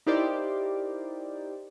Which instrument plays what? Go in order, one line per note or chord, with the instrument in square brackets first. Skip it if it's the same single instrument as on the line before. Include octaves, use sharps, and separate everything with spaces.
[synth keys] D#4 E4 G4 A#4 C5 D5